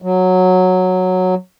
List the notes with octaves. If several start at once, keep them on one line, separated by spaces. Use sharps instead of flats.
F#3